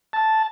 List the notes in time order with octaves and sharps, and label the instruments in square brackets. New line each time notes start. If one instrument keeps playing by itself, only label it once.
[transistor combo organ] A5